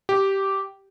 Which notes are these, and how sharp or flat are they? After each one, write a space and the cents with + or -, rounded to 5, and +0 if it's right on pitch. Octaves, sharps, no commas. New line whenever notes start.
G4 -10